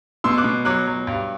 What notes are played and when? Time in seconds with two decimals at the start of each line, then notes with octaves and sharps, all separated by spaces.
0.24 B2 C6 E6
0.38 D6 F#6
0.44 B2
0.65 F#3 D6 F#6
0.87 F#3
1.07 G2